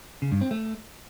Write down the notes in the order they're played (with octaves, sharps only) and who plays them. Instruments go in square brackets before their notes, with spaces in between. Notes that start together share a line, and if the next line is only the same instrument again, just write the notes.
[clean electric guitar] C#3
G2
C4
A3